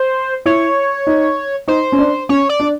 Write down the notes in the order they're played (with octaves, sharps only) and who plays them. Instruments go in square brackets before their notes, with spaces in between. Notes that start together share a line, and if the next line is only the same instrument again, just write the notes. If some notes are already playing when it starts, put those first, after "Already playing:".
Already playing: [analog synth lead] C5
[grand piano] E4 [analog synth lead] C#5
[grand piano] D#4
[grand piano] D#4 [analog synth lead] C5
[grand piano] C#4
D4
[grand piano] C#4 [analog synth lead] C#5
[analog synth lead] D5
[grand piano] D4